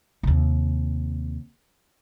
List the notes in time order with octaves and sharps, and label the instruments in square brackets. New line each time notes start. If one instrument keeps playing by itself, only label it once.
[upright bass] D#2 C3